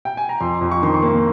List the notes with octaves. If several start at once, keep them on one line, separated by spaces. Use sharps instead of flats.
G5
G#5
A#5
F2 C6
F2
C#6
D#3 C6
C#6
A#3